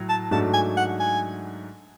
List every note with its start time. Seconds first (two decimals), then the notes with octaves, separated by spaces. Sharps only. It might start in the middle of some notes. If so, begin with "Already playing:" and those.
Already playing: A2 F#3
0.09 A5
0.31 G#2 F#3 A3 D4 F#4 A5
0.54 G#5
0.77 F#5
1.00 G#5